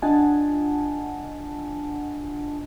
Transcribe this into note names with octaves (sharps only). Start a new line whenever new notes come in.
D4 F4 D#5 F#5 G#5 A5